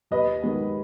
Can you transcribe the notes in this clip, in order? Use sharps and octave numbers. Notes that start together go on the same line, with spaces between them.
D#2 B4 D#5
D#3 G#3 B3